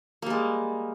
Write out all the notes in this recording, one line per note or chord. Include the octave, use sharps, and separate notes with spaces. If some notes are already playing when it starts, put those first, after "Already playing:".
G3 G#3 A#3